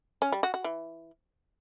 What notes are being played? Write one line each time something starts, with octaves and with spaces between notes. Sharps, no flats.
C#4
G3
F#4
F#4
E3